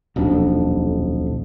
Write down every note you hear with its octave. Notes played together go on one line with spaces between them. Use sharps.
D#1 B1 F2 D4